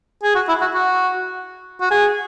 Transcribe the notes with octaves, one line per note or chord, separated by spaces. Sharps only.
G#4
F#4
E4
F#4
F#4
F#4
G#4